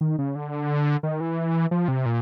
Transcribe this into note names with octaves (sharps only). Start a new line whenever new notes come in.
D#3
C#3
D3
D#3
E3
F3
C3
A#2